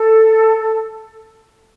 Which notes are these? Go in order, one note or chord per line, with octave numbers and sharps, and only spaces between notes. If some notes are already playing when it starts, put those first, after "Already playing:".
Already playing: A4